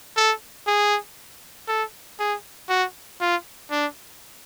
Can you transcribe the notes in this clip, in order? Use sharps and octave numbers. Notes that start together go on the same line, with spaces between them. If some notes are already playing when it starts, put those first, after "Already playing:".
A4
G#4
A4
G#4
F#4
F4
D4